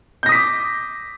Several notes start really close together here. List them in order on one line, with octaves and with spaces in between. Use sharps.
G6 A#6 D#6 B6 D6